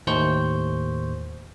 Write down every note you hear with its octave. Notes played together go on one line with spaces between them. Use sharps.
D#2 A2 C5 C#6 G6